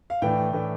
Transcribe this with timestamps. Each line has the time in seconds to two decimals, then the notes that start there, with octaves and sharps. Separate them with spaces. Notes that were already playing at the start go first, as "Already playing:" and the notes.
0.10 F5
0.22 A2 E3 A3 D4 G5
0.53 A2 E3 A3 D4